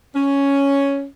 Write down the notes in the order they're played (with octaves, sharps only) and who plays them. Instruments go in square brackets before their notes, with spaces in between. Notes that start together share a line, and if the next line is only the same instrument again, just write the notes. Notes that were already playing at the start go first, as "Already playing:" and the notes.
[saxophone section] C#4